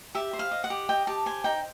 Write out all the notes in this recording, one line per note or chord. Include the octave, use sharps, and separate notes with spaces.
G4 E5
C5
F5
D#5
F#5
G4
D#5 G5
G4 A5
C5 G#5
D#4 G5